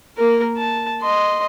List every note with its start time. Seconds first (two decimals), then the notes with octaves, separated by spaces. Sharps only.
0.18 A#3 A#4
0.57 A5
1.02 D#5 C6